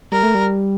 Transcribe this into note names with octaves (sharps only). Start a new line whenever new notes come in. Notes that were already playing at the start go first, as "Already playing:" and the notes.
G3 A#4
A3
G3